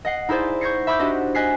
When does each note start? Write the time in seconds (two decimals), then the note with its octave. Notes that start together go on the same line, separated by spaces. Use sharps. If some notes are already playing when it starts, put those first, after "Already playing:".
0.05 D#5 F#5 C7
0.29 D#4 E4 G#4 C5 D5
0.61 C#6 G6 G#6 A#6 C7 C#7
0.87 E5 B5 D6 E6 G6
0.99 D4 F#4 G4 C5 D#5
1.35 D#5 G#5 F#6 B6 C7